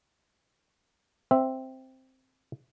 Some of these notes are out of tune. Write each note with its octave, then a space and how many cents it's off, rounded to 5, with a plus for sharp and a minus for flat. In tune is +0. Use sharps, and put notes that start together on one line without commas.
C4 +0 E5 +0